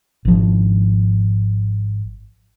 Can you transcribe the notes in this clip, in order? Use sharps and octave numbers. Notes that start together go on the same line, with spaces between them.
G#1 F3